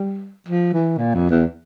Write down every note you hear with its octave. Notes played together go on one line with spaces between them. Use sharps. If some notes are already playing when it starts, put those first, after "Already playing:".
Already playing: G3
F3
E3
A#2
F2
E2